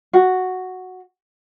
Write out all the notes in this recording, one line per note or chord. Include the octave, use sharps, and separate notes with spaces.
F#4